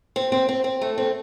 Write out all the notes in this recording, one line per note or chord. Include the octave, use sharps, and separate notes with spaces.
C4
C4
C4
C4
A3
C4